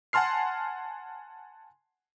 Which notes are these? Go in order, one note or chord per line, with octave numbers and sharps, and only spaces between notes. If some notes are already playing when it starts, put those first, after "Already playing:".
F#5 G#5 A5 C6 F6 C7